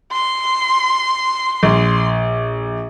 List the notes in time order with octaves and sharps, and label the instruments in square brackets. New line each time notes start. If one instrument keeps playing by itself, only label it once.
[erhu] C6
[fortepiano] A#1